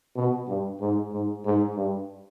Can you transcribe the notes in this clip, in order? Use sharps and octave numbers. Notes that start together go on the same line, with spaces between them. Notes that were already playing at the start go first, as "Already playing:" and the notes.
B2
G2
G#2
G#2
G#2
G2